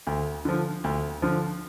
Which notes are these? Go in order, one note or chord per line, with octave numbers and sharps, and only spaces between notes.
D2
D3 F3
D2
D3 F3